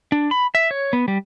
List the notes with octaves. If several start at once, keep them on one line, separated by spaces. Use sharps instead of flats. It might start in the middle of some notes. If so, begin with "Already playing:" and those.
D4
B5
E5
C#5
B3
G3